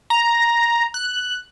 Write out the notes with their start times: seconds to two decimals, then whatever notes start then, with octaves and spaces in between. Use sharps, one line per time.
0.10 A#5
0.94 F#6